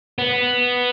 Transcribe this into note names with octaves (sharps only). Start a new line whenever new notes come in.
B3